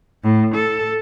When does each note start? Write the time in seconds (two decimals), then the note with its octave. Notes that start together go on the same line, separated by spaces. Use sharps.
0.24 A2
0.55 A4